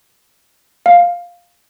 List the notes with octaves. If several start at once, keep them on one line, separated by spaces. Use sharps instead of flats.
F5